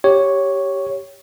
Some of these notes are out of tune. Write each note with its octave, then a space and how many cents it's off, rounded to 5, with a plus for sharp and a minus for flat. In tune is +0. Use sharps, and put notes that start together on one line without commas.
G4 -5 C#5 +0